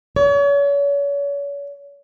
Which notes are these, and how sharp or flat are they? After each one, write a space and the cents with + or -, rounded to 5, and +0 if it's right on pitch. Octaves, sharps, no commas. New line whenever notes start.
C#5 +35